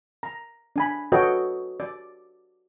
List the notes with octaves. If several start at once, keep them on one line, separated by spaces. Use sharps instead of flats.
A#5
D4 G#5 B5
F#4 A4 B4 C#5 D#5 G5
D5